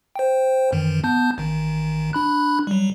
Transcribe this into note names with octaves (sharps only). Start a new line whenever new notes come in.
C5 G5
F#2 D#3 E3
B3 A5 G6
A1 D#3
D4 B5 F#6
F#3 G3